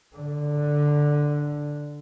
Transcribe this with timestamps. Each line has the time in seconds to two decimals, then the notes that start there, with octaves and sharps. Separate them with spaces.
0.16 D3